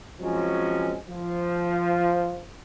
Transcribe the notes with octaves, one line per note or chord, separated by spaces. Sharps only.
F3 F#3 G#3 C4 C#4
F3